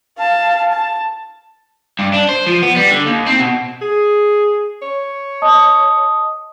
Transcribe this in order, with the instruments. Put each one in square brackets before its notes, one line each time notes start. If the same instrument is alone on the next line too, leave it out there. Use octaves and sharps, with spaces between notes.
[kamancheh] F5 A5
A5
[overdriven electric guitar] G2
D4
C5
F3
B3
G3
D3
D#2
C4
B2
[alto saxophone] G#4
C#5
[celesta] D#5 A5 D#6